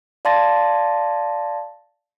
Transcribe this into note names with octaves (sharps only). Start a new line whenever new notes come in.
D5 F5 A5 C6 A6 A#6